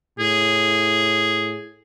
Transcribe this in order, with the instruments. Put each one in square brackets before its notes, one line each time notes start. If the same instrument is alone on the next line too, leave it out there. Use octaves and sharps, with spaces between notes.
[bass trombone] A2 [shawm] G#4